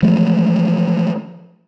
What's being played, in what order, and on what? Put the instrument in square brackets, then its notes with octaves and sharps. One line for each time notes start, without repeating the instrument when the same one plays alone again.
[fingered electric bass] E3 F3 G#3 A3